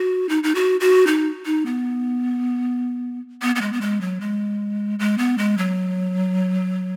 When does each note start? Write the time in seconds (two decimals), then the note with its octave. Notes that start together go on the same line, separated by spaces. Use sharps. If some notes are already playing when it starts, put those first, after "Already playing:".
Already playing: F#4
0.29 D#4
0.44 D#4
0.55 F#4
0.80 F#4
1.07 D#4
1.46 D#4
1.66 B3
3.42 B3
3.56 B3
3.61 G#3
3.73 B3
3.81 G#3
4.01 F#3
4.21 G#3
4.99 G#3
5.18 B3
5.38 G#3
5.58 F#3